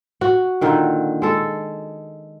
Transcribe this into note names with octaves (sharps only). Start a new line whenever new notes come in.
F#4 F#5
A#2 D3 D#3
G#3 A4